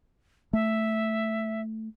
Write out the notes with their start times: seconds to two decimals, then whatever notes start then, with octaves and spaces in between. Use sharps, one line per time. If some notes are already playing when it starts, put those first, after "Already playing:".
0.53 A3 E5